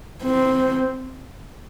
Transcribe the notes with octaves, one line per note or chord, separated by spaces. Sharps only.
C4